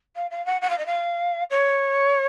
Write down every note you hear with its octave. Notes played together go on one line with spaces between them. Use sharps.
F5
F5
F#5
F#5
F5
D#5
F5
C#5